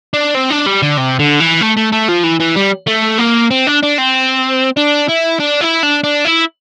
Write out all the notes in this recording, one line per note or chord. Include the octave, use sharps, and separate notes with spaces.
D4
C4
D4
G3
D3
C3
D3
E3
A3
A3
A3
F3
E3
E3
G3
A3
A#3
C4
D4
D4
C4
D4
E4
D4
E4
D4
D4
E4